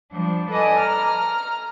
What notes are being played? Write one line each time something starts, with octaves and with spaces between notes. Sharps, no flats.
F3 G3 D4
A4 B4 D5 D#5 G#5
A#5 F6